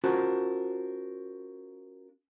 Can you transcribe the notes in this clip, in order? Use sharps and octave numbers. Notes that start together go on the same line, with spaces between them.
C#4 F4 F#4 A#4 C5 A5